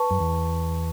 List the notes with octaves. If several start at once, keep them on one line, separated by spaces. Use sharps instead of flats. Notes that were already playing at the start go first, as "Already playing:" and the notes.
Already playing: B4 A5 C#6
F#2
E2